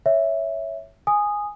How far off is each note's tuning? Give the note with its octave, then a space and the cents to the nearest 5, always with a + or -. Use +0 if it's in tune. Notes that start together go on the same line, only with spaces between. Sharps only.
C#5 +0 E5 +0
G#5 -5 D#6 -10